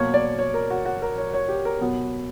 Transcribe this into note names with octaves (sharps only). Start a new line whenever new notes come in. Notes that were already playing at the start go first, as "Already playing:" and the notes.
Already playing: B2 F#3 A#3 C#5
D5
C#5
A#4
F#4
F#4
A#4
C#5
C#5
G4
A#4
B2 F#3 B3